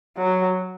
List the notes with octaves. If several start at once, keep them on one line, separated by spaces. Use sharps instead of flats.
F#3